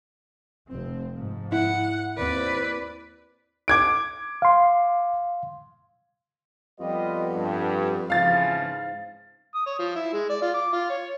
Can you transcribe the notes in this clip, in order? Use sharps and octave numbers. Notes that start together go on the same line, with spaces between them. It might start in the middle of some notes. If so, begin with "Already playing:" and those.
F1 C4
G#2 F3
E4 F#5
D#2 C4 B4 D5
D6 G#6 D7
F5 C6
F2 G3 B3 F4 G4 B4 D#5
G2
G#2 C#3 E3 F3 F5 A6
D#6
C#5
F3
E4
G#3
D5
F4
D6
F4
C#5